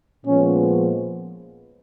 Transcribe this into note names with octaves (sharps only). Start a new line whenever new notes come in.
A#2 F3 G#3 B3 C#4